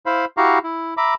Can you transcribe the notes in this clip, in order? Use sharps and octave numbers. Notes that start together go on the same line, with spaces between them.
E4 C5 F5 B5
E4 F#4 G4 F5 A#5 C#6
E4
E5 A#5 B5 D6